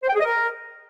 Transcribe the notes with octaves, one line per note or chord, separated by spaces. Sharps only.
C5
G5
G#4
D#5
A#4